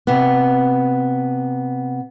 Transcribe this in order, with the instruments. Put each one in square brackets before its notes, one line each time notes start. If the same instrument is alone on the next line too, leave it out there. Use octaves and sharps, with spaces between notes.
[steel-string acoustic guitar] C3 B3